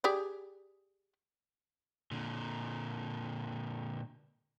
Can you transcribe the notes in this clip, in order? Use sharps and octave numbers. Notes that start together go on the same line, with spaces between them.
G4 G#4 D5
A#2 D3